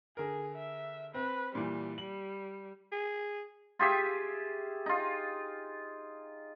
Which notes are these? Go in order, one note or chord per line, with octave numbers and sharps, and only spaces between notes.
D3 G#4 A#4
E5
C4 B4
A#2 E3 G3
G3 F#7
G#4
F4 G4 G#4 E5
D#4 F4